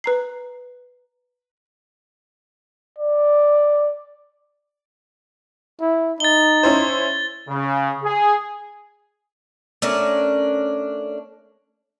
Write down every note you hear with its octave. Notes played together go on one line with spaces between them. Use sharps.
B4 A#5 C7
D5
E4
D#4 A6 G7
C#4 E4 C5
C#3
G#4
A3 C#4 D4 A#4